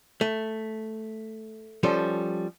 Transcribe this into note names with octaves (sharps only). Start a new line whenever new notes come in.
A3
F3 G3 C#4 A4